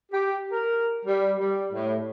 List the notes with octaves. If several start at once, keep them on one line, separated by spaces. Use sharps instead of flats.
G4
A#4
G3
G3
A2